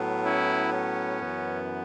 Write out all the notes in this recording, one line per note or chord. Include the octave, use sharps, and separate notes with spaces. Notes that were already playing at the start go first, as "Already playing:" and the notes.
Already playing: A2 F#3 B3
C#4 E4
C#4
F#2 E3 B3